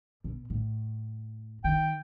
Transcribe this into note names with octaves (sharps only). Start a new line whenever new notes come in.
B2
A2
D#3 G5